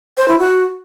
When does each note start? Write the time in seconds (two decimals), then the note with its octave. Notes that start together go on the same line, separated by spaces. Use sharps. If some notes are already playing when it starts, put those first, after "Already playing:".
0.17 C5
0.28 E4
0.39 F#4